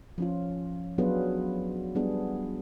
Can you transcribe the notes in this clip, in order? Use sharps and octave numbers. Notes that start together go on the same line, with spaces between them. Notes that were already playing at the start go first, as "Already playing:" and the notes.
F3 C#4 F4
F#3 B3 D4 F4 G#4 B4
G3 B3 D4 G#4